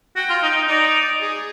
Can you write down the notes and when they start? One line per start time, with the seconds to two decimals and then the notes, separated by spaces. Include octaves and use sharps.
0.16 F#4 G5
0.29 F4
0.43 D#4
0.55 D#4
0.68 D#4 D5
1.20 G#4